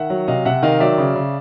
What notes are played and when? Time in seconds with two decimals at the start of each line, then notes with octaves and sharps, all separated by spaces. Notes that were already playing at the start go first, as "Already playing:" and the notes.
Already playing: D#3 E5 F#5
0.10 F#3
0.28 C3 D#5 F5
0.45 C3 E5 F#5
0.63 D#3 D#5 F5
0.80 F#3 D5 E5
0.98 C#3
1.16 C#3